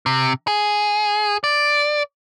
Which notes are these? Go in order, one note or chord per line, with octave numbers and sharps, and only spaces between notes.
C3
G#4
D5